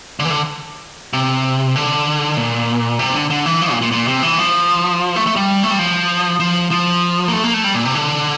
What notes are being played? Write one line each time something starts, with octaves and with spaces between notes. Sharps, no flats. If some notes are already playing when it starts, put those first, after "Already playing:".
D3
E3
D3
C3
D3
A#2
C3
D3
D3
E3
F3
A#2
A#2
A#2
C3
E3
F3
A3
A3
G3
A3
G3
F3
F3
F3
A#3
A3
A#3
A3
G3
A#2
C3
D3